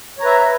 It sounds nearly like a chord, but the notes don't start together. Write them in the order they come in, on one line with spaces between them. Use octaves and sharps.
C#5 A#5 B4 E5